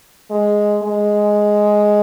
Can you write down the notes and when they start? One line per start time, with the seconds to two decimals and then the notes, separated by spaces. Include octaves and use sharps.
0.30 G#3
0.83 G#3